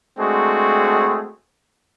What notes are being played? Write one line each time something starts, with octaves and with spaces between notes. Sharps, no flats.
G#3 A3 C4 D4 F#4 G#4